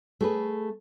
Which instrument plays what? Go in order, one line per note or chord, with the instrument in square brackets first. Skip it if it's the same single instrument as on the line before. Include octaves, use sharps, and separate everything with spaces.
[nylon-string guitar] A3 G#4 B4